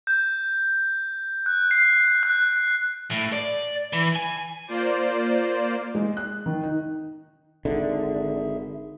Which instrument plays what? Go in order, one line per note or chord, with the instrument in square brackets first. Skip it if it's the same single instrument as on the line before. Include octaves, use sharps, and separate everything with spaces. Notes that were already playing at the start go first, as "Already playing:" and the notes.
[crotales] G6
F#6
C7
F#6
[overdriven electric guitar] A2
D5
E3
G#5
[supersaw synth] A#3 F4 C5 D5
[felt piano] G#3
F#6
D#3
D#4
[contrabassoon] G#1 [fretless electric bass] D3 [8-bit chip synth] G#4 E5